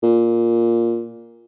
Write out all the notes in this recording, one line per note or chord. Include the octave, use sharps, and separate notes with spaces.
A#2